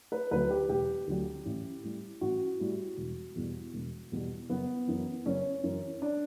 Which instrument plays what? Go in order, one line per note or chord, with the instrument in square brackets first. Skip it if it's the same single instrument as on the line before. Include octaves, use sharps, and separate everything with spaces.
[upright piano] B4
D2 D3 F#3 B4
G4
E1 G4
D2 D3 F#3
A1
A2 G3
A1 F#4
A2 G3
E1
E2 B2 G3
E1
E2 B2 G3
F#1 B3
F#2 E3
F#1 C#4
F#2 E3
D4